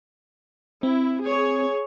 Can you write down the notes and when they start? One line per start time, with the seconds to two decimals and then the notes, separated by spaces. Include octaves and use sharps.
0.83 C4 E4
1.22 G#4 C#5